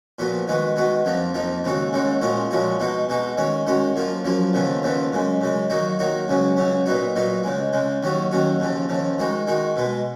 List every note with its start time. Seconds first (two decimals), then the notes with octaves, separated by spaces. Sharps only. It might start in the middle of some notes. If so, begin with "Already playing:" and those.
0.19 A#2 F3 B3 F#4
0.48 D#3 G#3 B3 F#4
0.76 D#3 G#3 B3 F#4
1.05 F2 F3 A#3 D#4
1.34 F2 F3 A#3 D#4
1.64 D#2 C#3 G#3 D#4 F#4
1.93 D#2 C#3 G#3 D#4 F#4
2.21 A#2 F3 G#3 C#4 F#4
2.51 A#2 F3 G#3 C#4 F#4
2.80 B2 G#3 D#4 F#4
3.09 B2 G#3 D#4 F#4
3.37 D#3 G#3 C#4 F#4
3.67 D#3 G#3 C#4 F#4
3.96 F#2 F3 A#3 F4
4.25 F#2 F3 A#3 F4
4.53 D#2 C#3 F3 B3
4.82 D#2 C#3 F3 B3
5.13 F#2 C#3 G#3
5.41 F#2 C#3 G#3
5.70 D#3 F#3 A#3 D#4 F#4
5.99 D#3 F#3 A#3 D#4 F#4
6.28 C#2 C#3 F#3 C#4
6.57 C#2 C#3 F#3 C#4
6.86 A#2 F#3 B3 D#4 F#4
7.16 A#2 F#3 B3 D#4 F#4
7.43 C#2 C#3 G#3
7.73 C#2 C#3 G#3
8.03 D#2 D#3 F#3 C#4 F#4
8.31 D#2 D#3 F#3 C#4 F#4
8.60 D#2 C#3 F3
8.89 D#2 C#3 F3
9.18 D#3 G#3 D#4 F#4
9.47 D#3 G#3 D#4 F#4
9.76 B2 G#3 B3